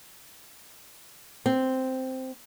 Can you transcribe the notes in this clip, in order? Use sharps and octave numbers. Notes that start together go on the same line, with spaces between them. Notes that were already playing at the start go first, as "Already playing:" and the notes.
C4